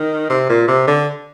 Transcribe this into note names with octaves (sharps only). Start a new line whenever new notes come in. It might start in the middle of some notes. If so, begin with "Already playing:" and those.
Already playing: D#3
C3
A#2
C3
D3